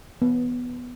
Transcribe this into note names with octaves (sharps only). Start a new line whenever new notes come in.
B3